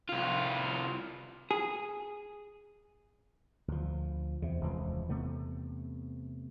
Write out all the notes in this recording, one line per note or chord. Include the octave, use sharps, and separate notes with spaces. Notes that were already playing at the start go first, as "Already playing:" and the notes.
C2 F4
G#4
D2 F3
E2 C3
F1 C#2 F3
C3 A3 B3